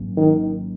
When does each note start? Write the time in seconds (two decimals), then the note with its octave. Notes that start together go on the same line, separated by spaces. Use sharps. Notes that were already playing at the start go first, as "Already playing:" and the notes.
Already playing: G#1 G#2 F#3 A#3 C#4
0.17 D#3